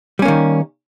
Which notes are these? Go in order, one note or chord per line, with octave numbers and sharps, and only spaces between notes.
D#3 G3 A#3 C#4